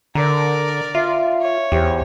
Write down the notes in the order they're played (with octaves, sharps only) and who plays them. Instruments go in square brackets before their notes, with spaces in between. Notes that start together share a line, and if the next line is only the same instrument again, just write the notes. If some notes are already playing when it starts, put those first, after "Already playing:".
[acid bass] D3 [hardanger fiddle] A#4 D5 [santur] A#5
[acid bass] F4 [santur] E5
[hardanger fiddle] C#5
[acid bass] E2 [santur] G4 C5